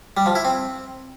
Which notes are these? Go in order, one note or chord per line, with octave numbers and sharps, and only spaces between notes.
G3
F3
E4
C4